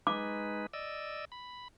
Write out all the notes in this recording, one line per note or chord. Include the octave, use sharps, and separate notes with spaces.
G#3 D#4 B4 D6
D5 D#5 E6
B5